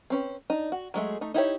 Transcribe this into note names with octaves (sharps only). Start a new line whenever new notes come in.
C4 C#4 B4
D4 D#4
F#4
F#3 G#3 A3 G#4
A3 D#4
D#4 E4 G4 C#5